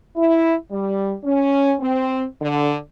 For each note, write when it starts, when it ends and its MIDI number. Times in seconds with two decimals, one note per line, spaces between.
0.16 0.55 64
0.69 1.13 55
1.24 1.74 61
1.80 2.23 60
2.41 2.75 50